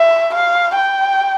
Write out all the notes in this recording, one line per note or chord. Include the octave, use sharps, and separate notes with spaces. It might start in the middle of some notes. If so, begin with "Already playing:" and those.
Already playing: E5
F5
G5